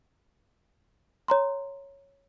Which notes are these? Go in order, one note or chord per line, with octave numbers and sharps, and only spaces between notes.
C#5 A#5 C6